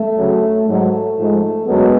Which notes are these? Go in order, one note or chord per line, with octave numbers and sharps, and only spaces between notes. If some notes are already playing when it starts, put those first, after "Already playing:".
Already playing: A3
D2 C#3 F#3
G#2 F#3 A3
G#2 F3 G#3
F#2 D3 F#3 G#3 B3